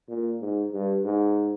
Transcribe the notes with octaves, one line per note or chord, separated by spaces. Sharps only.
A#2
G#2
G2
G#2